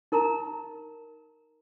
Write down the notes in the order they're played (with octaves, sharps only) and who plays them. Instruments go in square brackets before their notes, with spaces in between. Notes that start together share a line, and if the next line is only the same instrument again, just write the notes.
[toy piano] D#4 A#4 A5 A#5